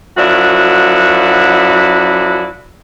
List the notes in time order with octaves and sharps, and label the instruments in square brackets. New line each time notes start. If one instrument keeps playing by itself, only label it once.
[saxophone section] F#2 F3 E4 F#4 D5